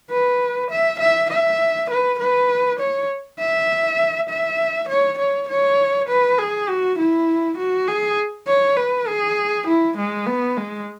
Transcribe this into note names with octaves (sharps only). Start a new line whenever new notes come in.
B4
E5
E5
E5
B4
B4
C#5
E5
E5
C#5
C#5
C#5
B4
G#4
F#4
E4
F#4
G#4
C#5
B4
G#4
E4
G#3
B3
G#3